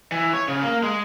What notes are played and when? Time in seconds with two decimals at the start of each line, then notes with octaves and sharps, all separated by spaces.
0.12 E3
0.33 C#5
0.48 C#3
0.62 A#3
0.83 G#3